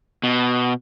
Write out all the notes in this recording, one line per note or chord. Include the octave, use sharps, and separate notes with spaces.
B2